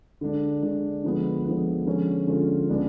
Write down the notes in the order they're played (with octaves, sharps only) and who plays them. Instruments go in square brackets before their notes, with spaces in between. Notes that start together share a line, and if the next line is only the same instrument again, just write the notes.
[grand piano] D3 G#3 D4
D3 G#3 D4
D3 F3 G#3 B3
D3 F3 G#3 B3
D3 F3 G#3 C#4 F4
D3 F3 G#3 C#4 F4
C#3 G#3 B3 D4